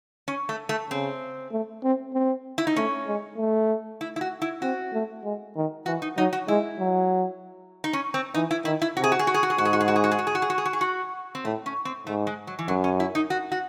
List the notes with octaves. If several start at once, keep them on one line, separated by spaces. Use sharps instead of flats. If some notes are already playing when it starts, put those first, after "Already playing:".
C#4
A3
A3
C#3 C4
A3
C4
C4
E4
D#4
A3 C#4
G#3
A3
E4
E4
F#4
E4
C4 F#4
A3
G#3
D#3
E3 F#4
D#4
F#3 D#4
F#4
G#3 E4
F#3
D#4
C#4
C4
E3 D#4
E4
D#3 E4
E4
C3 F#4
G#4
F#4
G#4
F#4
G#4
F#4
G#4
G#2 F#4
G#4
F#4
G#4
F#4
G#4
F#4
G#4
F#4
G#4
F#4
G#4
F#4
G#4
F#4
G#4
F#4
C4
A2 A3
C#4
C4
G#2 A3
G#3
F#3
E3
F#2 F#3
C#4
E4
D#4
F#4
F#4